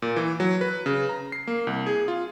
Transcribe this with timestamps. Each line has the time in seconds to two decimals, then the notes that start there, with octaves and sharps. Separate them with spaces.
0.02 A#2
0.16 E3
0.40 F#3
0.61 B4
0.86 C#3
1.09 A#5
1.32 C7
1.47 A#3
1.67 C2
1.86 G#4
2.08 F4